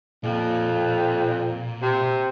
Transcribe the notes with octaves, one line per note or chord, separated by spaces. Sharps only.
F2 A#2
C3